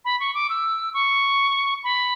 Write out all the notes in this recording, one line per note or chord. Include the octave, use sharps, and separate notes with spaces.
B5
C#6
D6
E6
C#6
B5